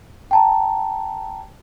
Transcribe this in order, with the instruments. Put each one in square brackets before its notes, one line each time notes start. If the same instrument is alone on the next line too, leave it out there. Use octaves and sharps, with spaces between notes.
[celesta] G5 A5 A#5